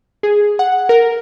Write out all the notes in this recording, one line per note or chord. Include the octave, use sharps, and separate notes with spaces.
G#4
F#5
A#4